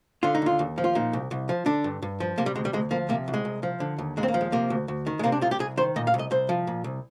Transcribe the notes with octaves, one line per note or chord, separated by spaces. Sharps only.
D3 F4
D#4
D#2 F4
D#2
F3
F4
A#2 D#4
C2
C2
F3
D3 D4
G2
G2
F3
C3 A#3
G3
D2 G#3
G3
D2 G#3
F3 A#3
C3 A#3
C2
G#3
C2
F3
D3
D#2
D#2 G#3
C4
A#3
F3
G#3
C3 A#3
D2
D2
D#3
G#3
C3 A#3
D4
C2 F4
G4
C2 G#4
D#3 C5
A#2 D#5
F5
C2
D#5
C2 C5
F3
A#2
C2